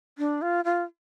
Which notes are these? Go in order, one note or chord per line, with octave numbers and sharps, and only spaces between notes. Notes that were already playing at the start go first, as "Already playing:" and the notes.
D4
F4
F4